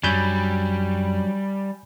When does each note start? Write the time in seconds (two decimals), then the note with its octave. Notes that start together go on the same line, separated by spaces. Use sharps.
0.03 F#2 F#3 G3 D4 G#5 B5 G6